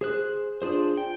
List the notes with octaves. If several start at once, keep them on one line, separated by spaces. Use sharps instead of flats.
G#4 C5 F#6
D4 F4 G#4 C5
G5